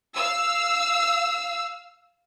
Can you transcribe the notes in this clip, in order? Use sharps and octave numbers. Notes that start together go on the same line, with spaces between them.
F5 E6